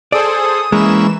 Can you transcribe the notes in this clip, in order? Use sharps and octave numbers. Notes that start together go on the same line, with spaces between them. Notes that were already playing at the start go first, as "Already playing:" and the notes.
G#4 A4 C5 D5 D#6
E3 G#3 A#3 C#4 E4 E7